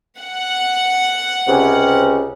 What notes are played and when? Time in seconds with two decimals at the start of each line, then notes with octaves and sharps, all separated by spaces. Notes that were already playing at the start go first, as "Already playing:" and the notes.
0.20 F#5
1.48 C#2 C3 C#4